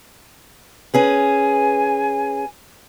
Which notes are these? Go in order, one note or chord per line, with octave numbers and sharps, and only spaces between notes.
C#4 G#4 B4 G#5